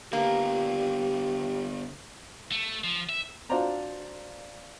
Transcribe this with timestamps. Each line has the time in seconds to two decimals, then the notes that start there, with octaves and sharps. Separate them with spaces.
0.13 D3 A#3 B3 G4
2.52 A3
2.84 F3
3.09 E5
3.50 D4 F4 F#4 C5 D5 A#5